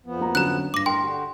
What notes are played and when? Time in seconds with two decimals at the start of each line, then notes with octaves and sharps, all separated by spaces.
0.06 F2 F3 B3
0.21 A#3 A#5
0.35 D3 F#3 C#4 A#5 F#6
0.74 E2 G2 D6 A#6
0.86 A2 A#4 G5 C6
1.02 D3 F#4 G4